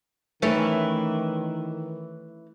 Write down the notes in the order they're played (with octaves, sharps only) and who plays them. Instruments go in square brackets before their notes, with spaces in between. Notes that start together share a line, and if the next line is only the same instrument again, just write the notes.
[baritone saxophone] D#3 [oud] E3 C#4 [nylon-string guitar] A3